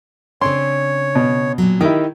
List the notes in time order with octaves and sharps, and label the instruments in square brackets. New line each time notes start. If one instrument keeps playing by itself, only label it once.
[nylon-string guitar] C#3 C4 D4 [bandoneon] C#5 [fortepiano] C6
[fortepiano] B2
[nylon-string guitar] A#2 F#3
[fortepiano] D#3 E4 [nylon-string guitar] D#4 G4